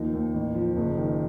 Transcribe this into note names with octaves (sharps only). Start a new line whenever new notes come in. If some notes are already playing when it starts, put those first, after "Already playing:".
Already playing: D#2 F3 D#4
D#2
A1
F3
F#1
D#3